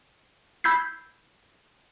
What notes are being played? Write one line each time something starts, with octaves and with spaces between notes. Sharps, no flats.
B5 E6 G6 G#6 B6 C7